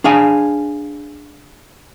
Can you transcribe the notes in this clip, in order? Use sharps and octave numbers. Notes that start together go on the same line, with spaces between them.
D4 G#4 F5 G#5